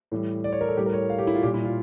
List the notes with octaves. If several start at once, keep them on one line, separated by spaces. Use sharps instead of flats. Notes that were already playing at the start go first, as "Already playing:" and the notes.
A2 E3 G3
D5
C#5
A#4
A4
A2 G3 G4
A#4
C#5
F5
G4
E4
F4
A#2 G3 G4
E4
F4